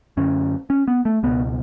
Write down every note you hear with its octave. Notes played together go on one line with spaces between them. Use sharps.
F#2 D3 C#4
C#4
B3
A3
C#2 B2 B3